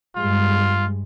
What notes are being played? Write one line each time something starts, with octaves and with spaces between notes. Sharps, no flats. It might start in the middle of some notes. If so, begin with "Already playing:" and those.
G2 G#3 F4